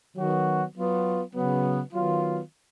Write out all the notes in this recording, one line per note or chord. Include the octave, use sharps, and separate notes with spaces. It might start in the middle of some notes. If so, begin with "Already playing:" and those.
D#3 F#3 B3 F#4
F#3 B3 F4
C#3 F#3 B3
D#3 F#3 B3 F4